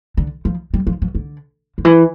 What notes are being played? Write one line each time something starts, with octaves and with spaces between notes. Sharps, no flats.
D3
F3
G3
F3
F3
D3
D3
E3